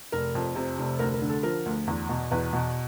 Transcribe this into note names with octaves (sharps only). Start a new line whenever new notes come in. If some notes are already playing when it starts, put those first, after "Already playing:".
F1 A#4
F2
C3
F1
D2 A#4
A#4
D3
A4
F3 A#4
D2
E2
B2
E2 B4
B2